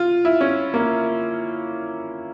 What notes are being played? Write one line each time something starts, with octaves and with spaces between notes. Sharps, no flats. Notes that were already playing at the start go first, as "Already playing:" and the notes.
Already playing: F4
E4
C#4
A#3